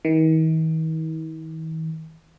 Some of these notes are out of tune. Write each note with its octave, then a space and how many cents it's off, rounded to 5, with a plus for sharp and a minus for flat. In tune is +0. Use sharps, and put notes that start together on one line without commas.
D#3 +45